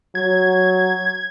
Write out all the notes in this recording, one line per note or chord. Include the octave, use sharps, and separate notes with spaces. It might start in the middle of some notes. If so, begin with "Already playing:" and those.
F#3 G#6